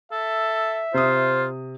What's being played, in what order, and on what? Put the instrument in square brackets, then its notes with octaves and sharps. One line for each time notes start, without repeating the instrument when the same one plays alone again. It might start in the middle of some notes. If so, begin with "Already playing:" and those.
[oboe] A4 [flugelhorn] E5
[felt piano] C3 D#6 [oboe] F4 [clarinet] C5